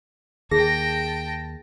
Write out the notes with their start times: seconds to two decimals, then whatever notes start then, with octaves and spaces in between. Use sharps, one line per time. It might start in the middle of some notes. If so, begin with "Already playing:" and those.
0.51 D#2 D#3 G#4 G5 A5 A#6